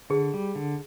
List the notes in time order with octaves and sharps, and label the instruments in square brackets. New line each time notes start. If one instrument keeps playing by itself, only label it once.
[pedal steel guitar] D3 [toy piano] G#4
[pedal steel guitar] G3
D3